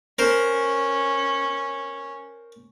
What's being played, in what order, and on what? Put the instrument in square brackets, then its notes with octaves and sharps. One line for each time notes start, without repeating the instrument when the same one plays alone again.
[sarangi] C#4 [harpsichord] A#4 C5